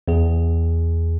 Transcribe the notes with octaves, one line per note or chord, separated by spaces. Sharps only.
E2 G#4